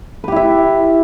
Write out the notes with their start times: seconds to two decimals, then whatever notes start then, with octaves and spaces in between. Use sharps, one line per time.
0.24 B4
0.28 G4
0.32 E4
0.36 E5